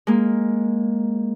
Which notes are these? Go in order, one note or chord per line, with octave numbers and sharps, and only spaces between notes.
G#3 A#3